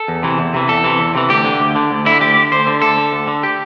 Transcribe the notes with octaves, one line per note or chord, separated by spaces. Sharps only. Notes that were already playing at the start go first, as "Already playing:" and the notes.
Already playing: A4
E2
C3 E3
E2
C3 E3
E2 A4
C3 E3
E2
C3 E3
D2 G4
D3
D2
D3
D2
D3 E4
D2 G4
D3
D2 C5
D3
D2 A4
D3
D2
D3
G4